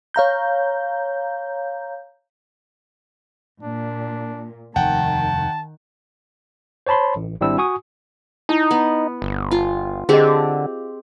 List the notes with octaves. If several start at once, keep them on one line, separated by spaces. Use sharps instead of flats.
C#5 F5 A#5 G6
A#2 D4
F1 D#2 D#3 F#5 G5 A5
C5 C#5 A5 B5 C6
A1
G#1 G3 C4 D4 E4 E6
F#4 G#5 C#6 D#6
D#4 E4 A5
B3
G1
F4
D3 C4 G4 G#4 D#5